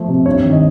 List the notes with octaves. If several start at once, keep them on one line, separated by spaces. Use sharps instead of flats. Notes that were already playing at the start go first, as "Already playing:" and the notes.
Already playing: F3 A3
C3
G2 C#5
D#3
D#5